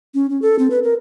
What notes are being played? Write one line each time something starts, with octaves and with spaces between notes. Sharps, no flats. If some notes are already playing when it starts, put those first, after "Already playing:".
C#4
C#4
A4
C4
B4
A#4